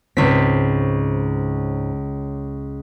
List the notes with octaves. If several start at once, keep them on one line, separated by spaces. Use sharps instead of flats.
C#2 G#2 C4 B6